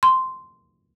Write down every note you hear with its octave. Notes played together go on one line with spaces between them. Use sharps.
C6